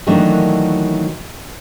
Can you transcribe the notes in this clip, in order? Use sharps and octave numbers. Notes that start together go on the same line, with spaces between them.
D#3 E3 F#3 A3 A#3 D4